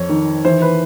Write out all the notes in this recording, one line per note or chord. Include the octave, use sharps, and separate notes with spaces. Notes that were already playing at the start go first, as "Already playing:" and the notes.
Already playing: F2 C#5
D#3
E3 C5
B4